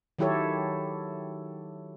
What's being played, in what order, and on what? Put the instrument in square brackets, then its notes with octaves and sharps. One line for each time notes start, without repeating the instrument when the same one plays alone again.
[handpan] D#3 F#3 E4 G4 A4 C#5